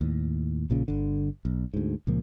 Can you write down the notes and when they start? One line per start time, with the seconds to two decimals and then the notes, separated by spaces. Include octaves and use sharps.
0.01 D#2 A2
0.70 A#1 A#2 C#3
0.88 G1 D3
1.45 B1
1.74 D2 G#2
2.07 C#2 A#2 F3 A#3